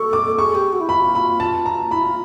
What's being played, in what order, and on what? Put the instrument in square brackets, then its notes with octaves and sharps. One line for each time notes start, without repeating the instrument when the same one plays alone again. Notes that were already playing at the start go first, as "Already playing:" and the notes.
Already playing: [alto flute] A4 [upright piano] C#6
[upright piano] D6
[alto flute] G#4 [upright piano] C#6
[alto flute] G4
F#4
E4
[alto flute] F4 [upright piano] B5
[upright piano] B5
A5
A#5
[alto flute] E4 [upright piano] B5
[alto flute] F4